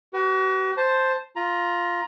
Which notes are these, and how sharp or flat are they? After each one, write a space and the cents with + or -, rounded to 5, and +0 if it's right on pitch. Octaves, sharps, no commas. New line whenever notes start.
F#4 +40 B4 +0
C5 +0 A5 +0
F4 +0 A#5 +20